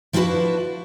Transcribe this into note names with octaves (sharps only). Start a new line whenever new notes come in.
F3 D4 E4 F#4 B4